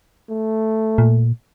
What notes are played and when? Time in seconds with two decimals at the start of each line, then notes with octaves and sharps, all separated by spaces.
0.30 A3
0.98 A#2